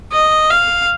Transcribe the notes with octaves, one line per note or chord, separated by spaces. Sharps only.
D#5
F5